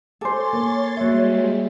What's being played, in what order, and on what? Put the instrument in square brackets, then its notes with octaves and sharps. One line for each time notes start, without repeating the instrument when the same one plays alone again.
[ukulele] A4 C5 [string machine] C#5 C6 A6 [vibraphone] G#5 D6
[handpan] A#3 A#4
[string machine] G3 G#3 [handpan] A#3 E5 [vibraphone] F#4 C#5